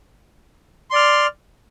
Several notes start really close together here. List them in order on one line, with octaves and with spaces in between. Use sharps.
C6 D5 F6